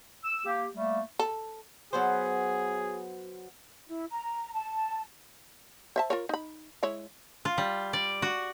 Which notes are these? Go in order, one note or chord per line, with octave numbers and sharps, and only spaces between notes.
E6
A#3 G4
G3 A3 A#3
A4
F#3 B3 G#4 C5
E4
A#5
A5
C5 E5 A5
F4 A#4 C#5
D#4 B5
G#3 E4 C#5
F4
G3
D5
F#4